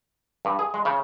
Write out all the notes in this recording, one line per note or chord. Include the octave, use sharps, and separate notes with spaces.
G2
G#4
G#3
C#3